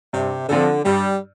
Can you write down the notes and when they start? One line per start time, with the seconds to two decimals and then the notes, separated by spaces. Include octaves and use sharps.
0.13 G2 C3
0.49 D3 F3 C4 F4 A4
0.85 G2 G3